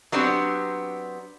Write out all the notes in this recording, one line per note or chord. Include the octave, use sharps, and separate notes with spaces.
F#3 B3 C4 D4 G4